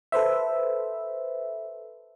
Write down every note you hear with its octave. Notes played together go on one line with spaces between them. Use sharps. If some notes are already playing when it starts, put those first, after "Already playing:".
A4 B4 C5 E5